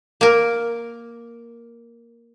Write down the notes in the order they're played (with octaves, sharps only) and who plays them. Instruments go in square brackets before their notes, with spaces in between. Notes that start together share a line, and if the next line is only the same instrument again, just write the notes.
[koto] A#3 A#4